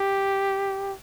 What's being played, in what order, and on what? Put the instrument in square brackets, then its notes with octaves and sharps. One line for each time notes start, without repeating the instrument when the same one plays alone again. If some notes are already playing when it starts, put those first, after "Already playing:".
Already playing: [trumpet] G4